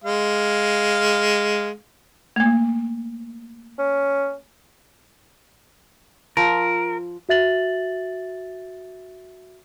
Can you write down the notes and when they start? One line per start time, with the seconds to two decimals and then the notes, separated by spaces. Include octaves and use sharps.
0.04 G#3 F5
2.36 A3 A#3
3.79 C#4
6.37 F3 A#4
7.29 F#4 E5 A6 F#7